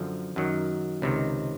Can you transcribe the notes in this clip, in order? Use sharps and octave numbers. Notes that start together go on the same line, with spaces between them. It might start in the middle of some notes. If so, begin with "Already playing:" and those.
Already playing: F#2 D3 F3
F#2 D#3 F#3
C#2 C3 D#3